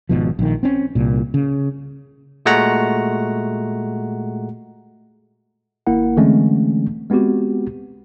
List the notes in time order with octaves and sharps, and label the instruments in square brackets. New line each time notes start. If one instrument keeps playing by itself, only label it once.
[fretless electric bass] G#1 B2 F3
A#1 D#3
C4 C#4
C2 A#2
C#3
[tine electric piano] A#2 G#3 A3 F#4 F#5 A#5
G#1 A#3 E4 A#4 F#5
D3 E3 G#3 A3 C4 C#4
G#3 B3 C4 F#4 G4